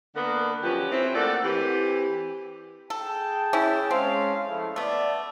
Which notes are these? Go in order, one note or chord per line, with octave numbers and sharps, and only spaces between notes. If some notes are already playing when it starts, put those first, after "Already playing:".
D3 A#3 B3 D4 A#4
F3 F#3 C#4 G4 B4
C4 E4
A3 A#3 A4 D5 F#5
E3 C4 G4
G#4 A4 G5 A5
C#4 E4
G#3 C4 C#4 F5
F3 A3 E4
A3 B3 D5